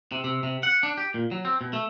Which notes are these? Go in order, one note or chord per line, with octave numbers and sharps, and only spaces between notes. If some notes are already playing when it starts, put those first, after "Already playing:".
C3
C3
C3
F#5
D4
G4
A#2
F#3
C4
B2
A3